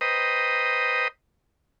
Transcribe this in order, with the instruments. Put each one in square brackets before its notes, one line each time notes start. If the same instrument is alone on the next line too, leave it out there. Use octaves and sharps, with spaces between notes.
[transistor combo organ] B4 C5 D#5 G5 A#5 D#6